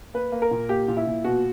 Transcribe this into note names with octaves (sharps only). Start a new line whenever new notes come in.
A#3 B4
A#3
A#4
A#2
A#3 G4
A#2
E4
A#2
B2 F#4